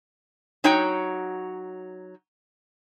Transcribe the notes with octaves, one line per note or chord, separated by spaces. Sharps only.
F#3 D#4 F#4 C#5 G5